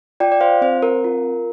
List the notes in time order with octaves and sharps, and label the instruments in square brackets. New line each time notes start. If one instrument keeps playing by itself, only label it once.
[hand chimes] F4 D5 G5
D5
C5 F5
C4 C5
A#4
F4